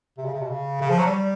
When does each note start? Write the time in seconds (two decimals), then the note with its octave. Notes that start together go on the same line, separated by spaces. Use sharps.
0.18 C3
0.26 C#3
0.34 C3
0.42 B2
0.50 C#3
0.81 C#3
0.90 F3
0.98 F#3
1.06 G3